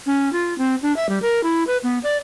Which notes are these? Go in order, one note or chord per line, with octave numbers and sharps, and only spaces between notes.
C#4
F4
C4
D4
E5
G3
A#4
E4
B4
B3
D5